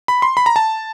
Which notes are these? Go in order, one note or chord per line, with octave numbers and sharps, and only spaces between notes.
B5
C6
B5
A#5
A5